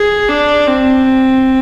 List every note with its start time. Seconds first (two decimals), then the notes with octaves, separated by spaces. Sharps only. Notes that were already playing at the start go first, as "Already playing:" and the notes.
Already playing: G#4
0.28 D4
0.67 C4